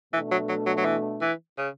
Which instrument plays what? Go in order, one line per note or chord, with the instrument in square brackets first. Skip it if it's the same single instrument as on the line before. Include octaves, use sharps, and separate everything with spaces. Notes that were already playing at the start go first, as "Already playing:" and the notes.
[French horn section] B2 A3 D4 [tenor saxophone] E3
[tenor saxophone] F#3
F#3
F#3
F#3
E3
E3
C#3